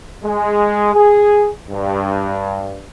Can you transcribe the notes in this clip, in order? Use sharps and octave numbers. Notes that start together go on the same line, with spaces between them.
G#3
G#4
G2